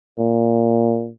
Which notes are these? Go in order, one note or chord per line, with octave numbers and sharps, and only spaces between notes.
A#2